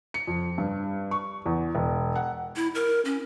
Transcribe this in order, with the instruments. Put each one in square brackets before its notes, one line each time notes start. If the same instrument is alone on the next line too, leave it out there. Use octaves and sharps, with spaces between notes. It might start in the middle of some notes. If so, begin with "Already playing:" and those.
[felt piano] C#7
F2
G2
C#6
E2
E1
F#5
[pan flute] E4
A#4
C#4